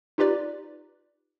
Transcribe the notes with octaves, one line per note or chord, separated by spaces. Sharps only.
D#4 F4 G4 B4 D5